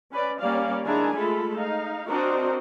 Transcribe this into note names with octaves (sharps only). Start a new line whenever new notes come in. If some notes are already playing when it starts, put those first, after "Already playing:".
C#4 B4 D5
G3 A#3 C#4 D5 F5
D#3 G#3 D4 E4 G#5 A#5
G#3 A3 F4 A4 B5
D#4 F5
C4 D4 F#4 A#4 C5 D#5